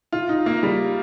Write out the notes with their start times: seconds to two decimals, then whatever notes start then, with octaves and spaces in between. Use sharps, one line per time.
0.12 F4
0.29 D#4
0.46 A#3
0.63 G3